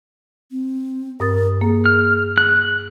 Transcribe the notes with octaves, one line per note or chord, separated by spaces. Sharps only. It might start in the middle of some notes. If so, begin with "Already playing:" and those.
C4
G2 A#4 D#6 A6
A#3 G#4
F6
F#6